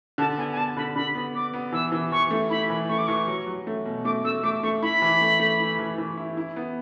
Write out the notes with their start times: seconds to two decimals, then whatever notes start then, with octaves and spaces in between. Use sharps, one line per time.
0.18 D3 A5
0.38 B3 G#5
0.52 G#5
0.57 D3 A5
0.76 D3 B5
0.96 D3 B5
1.15 B3
1.34 B3 D6
1.54 B3
1.72 E3 E6
1.92 E3
2.12 E3 C#6
2.30 A3
2.50 E4 B5
2.70 E3
2.89 A3 C#6
2.98 D6
3.07 E3 C#6
3.27 F#3
3.46 F#3
3.67 A3
3.85 B2
4.05 A3 D6
4.25 A3 E6
4.43 A3 D6
4.63 A3 C#6
4.83 E4 B5
5.02 E3
5.21 A3
5.40 A3
5.60 E4
5.79 E3
5.98 E3
6.17 E4
6.37 E4
6.56 B3